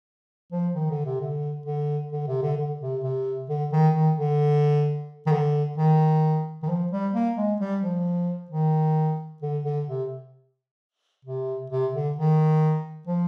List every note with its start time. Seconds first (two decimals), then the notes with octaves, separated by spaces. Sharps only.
0.52 F3
0.75 D#3
0.90 D3
1.06 C3
1.20 D3
1.66 D3
2.12 D3
2.28 C3
2.42 D3
2.57 D3
2.81 C3
3.03 C3
3.49 D3
3.72 D#3
3.94 D#3
4.18 D3
5.26 D#3
5.32 D3
5.77 D#3
6.63 D#3
6.68 F3
6.91 G3
7.14 A#3
7.37 G#3
7.60 G3
7.82 F3
8.50 D#3
9.42 D3
9.65 D3
9.88 C3
11.25 C3
11.70 C3
11.94 D3
12.16 D#3
13.07 F3